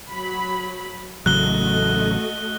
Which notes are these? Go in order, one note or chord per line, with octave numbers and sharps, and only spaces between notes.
F#3 B5
A1 C#3 F#3 A3 F#4 D#5 F#6 G7